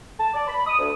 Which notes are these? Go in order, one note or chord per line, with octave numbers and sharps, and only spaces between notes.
A5
D5
B5
D#6
D2